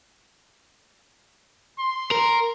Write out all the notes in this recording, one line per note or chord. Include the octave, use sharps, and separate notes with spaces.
C6
A#4